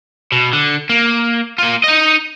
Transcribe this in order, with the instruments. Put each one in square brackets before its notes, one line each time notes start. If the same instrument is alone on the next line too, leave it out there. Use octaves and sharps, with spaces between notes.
[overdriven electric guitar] B2
D3
A#3
A#3 F4
D#4 D#5